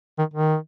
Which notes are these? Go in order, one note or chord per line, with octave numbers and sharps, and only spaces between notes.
D#3
D#3